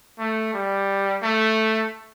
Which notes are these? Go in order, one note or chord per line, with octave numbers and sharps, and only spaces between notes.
A3
G3
A3